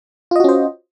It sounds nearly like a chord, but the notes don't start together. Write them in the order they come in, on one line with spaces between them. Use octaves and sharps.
F4 D#5 F#4 C#4 C5